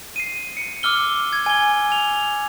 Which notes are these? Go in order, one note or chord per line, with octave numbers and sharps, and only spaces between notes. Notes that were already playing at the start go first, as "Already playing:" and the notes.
C7 D#7
C#7
D6 E6 F6 G7
G#6
G#5 G7
F7